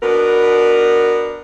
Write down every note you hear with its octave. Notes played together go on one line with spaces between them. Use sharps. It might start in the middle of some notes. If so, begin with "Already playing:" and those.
B2 B3 D4 A#4